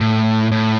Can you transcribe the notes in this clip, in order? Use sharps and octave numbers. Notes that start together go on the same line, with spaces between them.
A2
A2